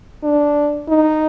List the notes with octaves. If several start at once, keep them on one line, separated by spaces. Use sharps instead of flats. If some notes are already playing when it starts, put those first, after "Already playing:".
D4
D#4